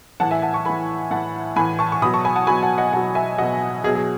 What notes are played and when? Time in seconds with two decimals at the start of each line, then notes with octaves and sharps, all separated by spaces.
0.20 A2 E3 F#5 A5
0.31 E5 G#5
0.42 F#5 A5
0.54 A5 C#6
0.65 A2 E3 G#5 B5
1.11 A2 E3 F#5 A5
1.56 A2 E3 G#5 B5
1.79 A5 C#6
1.92 C#6
2.02 B2 F#3 B5 D#6
2.14 A5 C#6
2.25 G#5 B5
2.36 F#5 A5
2.47 B2 F#3 G#5 B5
2.62 F#5 A5
2.78 D#5 F#5
2.92 B2 F#3 F#5 A5
3.15 E5 G#5
3.38 B2 F#3 D#5 F#5
3.84 B2 G#4
3.88 F#3
3.95 G#4